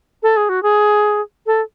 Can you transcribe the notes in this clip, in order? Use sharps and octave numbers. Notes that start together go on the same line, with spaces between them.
A4
G#4
F#4
G#4
A4